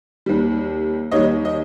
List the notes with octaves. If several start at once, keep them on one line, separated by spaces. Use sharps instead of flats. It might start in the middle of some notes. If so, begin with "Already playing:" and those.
D#2 D#3 G3
D#2 D#3 G3 C#5 D#5
D#5